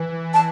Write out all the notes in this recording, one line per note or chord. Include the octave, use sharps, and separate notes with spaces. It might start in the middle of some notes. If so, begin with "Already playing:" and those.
Already playing: E3
A5